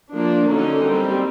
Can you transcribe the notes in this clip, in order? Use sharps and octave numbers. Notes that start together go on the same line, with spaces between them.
F3 A#3 D4
D3 F#3 A#3 C#4 D#4
G3 C4